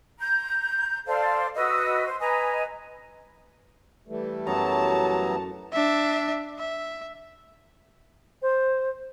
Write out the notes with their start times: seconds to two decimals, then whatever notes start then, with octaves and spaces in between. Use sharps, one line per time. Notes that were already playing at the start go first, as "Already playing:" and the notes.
0.19 A#5 G6
1.06 A4 C5 D5 F5
1.55 F#4 B4 D#5 E6
2.06 C5
2.20 B4 D#5 G#5 A#5
4.08 E3 G3 A3
4.47 F#2 F#3 B3 A5 A#5
5.73 D4 E5
6.59 E5
8.42 C5